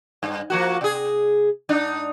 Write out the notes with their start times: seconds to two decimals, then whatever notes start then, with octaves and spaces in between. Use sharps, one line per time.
0.23 G2
0.50 F3 A#3 F#4
0.81 C3 G#4
1.69 G#2 D4 D#4